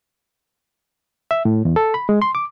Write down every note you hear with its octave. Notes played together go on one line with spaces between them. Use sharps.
E5
A2
E2
A4
B5
G#3
C6
D6